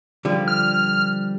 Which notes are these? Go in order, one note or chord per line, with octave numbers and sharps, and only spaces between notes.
D3 F3 G3
F6